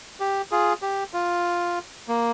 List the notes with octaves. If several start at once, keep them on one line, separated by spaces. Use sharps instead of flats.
G4
F4 G#4
G4
F4
A#3